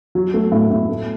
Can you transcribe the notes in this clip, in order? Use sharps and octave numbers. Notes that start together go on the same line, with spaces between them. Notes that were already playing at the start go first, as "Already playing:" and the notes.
F#3
A3
A2
A2
A3